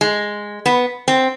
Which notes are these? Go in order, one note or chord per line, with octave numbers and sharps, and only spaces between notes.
G#3
B3
C4